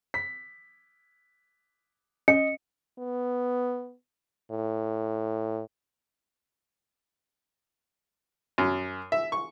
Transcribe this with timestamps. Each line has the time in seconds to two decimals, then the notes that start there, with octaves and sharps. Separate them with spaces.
0.14 B6
2.28 C#4 D#5 C#7
2.98 B3
4.51 A2
8.58 F#2
9.12 E5
9.32 C#6